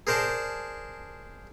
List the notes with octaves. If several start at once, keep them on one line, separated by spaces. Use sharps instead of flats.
G#4 A#4 C5 D5 A5